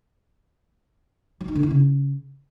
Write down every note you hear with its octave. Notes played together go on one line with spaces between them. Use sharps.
F#3
D#4
D3
E4
C#3